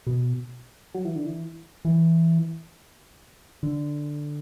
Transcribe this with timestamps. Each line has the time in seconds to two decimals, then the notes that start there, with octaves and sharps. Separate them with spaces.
0.07 B2
0.95 F#3
1.05 E3
1.16 D3
1.26 E3
1.85 E3
3.63 D3